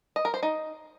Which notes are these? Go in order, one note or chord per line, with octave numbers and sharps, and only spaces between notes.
D#5
A#4
C5
D#4